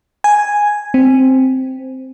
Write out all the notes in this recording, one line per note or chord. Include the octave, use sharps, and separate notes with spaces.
G#5
C4